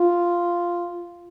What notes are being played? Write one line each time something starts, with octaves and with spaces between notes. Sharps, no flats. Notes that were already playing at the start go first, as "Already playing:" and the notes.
Already playing: F4